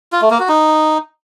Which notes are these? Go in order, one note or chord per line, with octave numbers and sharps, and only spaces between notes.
F4
A3
A#3
F#4
D#4